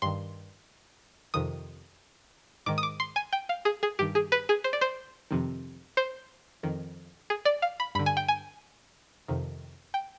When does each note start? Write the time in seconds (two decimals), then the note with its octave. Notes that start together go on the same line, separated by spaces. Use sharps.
0.02 G2 D#3 C6
1.34 F2 C3 D#3 D#6
2.66 G#2 D#3 D6
2.78 D#6
2.83 D6
3.00 C6
3.16 G#5
3.33 G5
3.49 F5
3.65 G#4
3.83 G#4
3.99 G2 D#3 G4
4.15 G#4
4.32 B4
4.49 G#4
4.64 C5
4.73 D5
4.81 C5
5.31 F2 C3 D#3
5.97 C5
6.63 F2 D#3
7.30 G#4
7.45 D5
7.62 F5
7.80 B5
7.95 G2 D3 B5
8.06 G#5
8.17 G5
8.28 G#5
9.28 F2 C3 D#3
9.94 G5